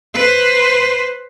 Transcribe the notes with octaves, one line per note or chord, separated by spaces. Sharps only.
B4 C5